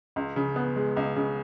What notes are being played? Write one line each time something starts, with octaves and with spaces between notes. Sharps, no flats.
C#2
C#3
B3
G#3
C#2
C#3